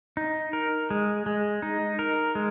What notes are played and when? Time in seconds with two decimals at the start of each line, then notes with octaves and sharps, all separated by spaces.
0.17 D#4
0.53 A#4
0.90 G#3
1.26 G#3
1.62 D#4
1.99 A#4
2.35 G#3